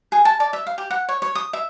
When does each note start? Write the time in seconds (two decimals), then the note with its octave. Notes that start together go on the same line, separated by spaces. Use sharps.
0.12 G#4
0.25 A5
0.40 D5
0.53 E5
0.67 F5
0.78 G4
0.90 F#5
1.09 C#5
1.22 C#5
1.35 D#6
1.53 E5